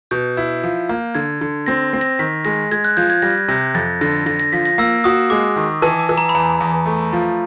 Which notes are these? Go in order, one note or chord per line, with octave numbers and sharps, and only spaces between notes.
B2 G6
E4
F3
A#3
D3 G#6
D3
C4 A#6
C4
A#6
D#3 B6
G#3 A#6
G#3 G#6
F#6
F3 G6
G#6
G3 A#6
C3 A#6
F2 A6
D3 A#6
D3 A#6
A#6
F3 B6
A#6
A#3 E6
F#4 D#6
G#3 D6
D#3
E3 A5
A5
E3
A#5
B5
E2 A#5
E2
A3
F3